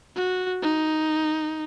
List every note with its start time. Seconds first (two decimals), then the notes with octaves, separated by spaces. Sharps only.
0.16 F#4
0.62 D#4